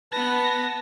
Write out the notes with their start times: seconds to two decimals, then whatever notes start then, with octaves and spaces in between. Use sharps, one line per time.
0.12 B3 B4 A5 A#6